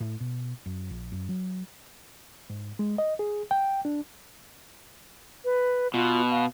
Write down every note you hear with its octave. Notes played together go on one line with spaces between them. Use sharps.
A2
B2
F#2
A#1
F#2
F#3
G#2
G#3
D#5
G#4
G5
D4
B4
B2 F4
F5